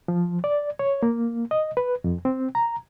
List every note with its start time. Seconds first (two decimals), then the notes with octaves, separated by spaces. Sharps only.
0.08 F3
0.44 D5
0.79 C#5
1.03 A#3
1.51 D#5
1.77 B4
2.04 F2
2.25 C4
2.55 A#5